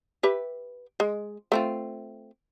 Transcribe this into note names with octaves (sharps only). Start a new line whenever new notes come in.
G4 B4 E5
G#3
A3 C4 F4